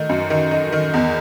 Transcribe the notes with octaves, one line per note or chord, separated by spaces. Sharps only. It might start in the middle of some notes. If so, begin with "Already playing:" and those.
Already playing: D#3 A3 D#4
F#2
D#3
D#4
D#3
E2